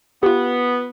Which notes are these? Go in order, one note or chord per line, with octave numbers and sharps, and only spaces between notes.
B3 F4 G4